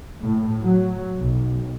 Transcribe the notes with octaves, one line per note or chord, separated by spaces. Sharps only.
A2
F#3
B1